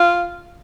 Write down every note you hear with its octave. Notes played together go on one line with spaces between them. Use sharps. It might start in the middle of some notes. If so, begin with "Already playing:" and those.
Already playing: F4